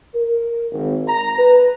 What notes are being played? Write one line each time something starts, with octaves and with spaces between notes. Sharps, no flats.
A#4
G#1
A#5
B4